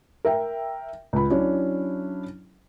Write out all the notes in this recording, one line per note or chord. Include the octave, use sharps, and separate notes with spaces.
A#4 E5 G5
C#2 B5
F#3 C#4 D4 E4